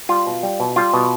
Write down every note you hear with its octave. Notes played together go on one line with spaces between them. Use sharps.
G3 F4
B2
G3
B2
G3 F4
B2